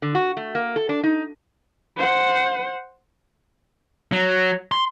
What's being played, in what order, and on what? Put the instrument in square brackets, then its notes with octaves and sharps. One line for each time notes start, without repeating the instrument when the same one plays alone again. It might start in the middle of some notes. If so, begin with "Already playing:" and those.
[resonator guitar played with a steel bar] D3
F#4
A3
A#3
A4
D4
D#4
[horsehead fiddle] C5 F#5
[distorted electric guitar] F#3
C6